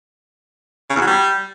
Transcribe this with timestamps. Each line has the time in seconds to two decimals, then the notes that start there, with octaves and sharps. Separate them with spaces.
0.90 C#3
0.96 E2
1.01 F#3
1.07 G3